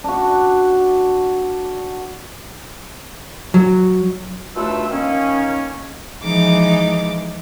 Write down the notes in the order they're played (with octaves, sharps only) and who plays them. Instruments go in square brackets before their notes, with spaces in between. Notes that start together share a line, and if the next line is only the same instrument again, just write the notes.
[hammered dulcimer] D4 F#4
[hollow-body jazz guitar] F#3
[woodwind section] D#2 B2 A3 D4 F4 E6
D#3 A#3 C#4
[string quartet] E3 F3 G#3 D#4 D6